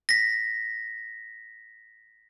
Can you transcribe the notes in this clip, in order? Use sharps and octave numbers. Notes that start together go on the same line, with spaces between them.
A#6 B6